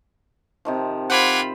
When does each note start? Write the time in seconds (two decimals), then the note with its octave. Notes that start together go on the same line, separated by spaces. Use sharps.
0.65 C3 D#3 F3
1.10 F4 C5 F#5 B5 D6 G#6